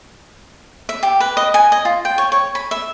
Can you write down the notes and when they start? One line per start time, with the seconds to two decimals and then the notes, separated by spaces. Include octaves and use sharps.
0.89 E5
1.03 G4
1.20 B4
1.37 D#5
1.54 G#5
1.72 D#5
1.85 F4
2.05 G5
2.18 C#5
2.32 C#5
2.55 B5
2.71 E5